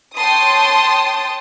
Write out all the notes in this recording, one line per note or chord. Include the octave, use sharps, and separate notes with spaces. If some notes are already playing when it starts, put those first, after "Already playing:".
C#5 G5 A5 C6 D#6